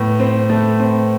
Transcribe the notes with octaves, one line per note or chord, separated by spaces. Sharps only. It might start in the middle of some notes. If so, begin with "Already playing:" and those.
Already playing: A2 B3
C4
A3
C4